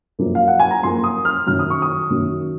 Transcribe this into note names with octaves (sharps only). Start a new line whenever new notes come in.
F#2 F3 A#3
F5
F#5
G#5
A#5
F#2 F3 A#3 C6
D#6
F6
F#2 D#3 F#3 F6
D#6
C#6
D#6
F#2 D#3 F#3